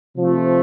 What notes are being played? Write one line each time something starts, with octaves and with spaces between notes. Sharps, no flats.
C3 F3 A3